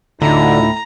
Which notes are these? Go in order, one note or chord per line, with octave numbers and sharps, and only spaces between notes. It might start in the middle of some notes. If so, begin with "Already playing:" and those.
D2 A2 D3 D#4 F4 A#5